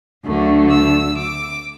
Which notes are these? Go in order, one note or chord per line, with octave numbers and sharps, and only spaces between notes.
D2 D3 F#3 A3
E6
D6